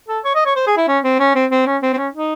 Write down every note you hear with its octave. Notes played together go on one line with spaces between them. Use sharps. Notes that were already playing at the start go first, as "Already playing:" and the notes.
A4
C#5
D#5
C#5
C5
G#4
E4
C#4
C4
C#4
C4
C4
C#4
C4
C4
C#4
D#4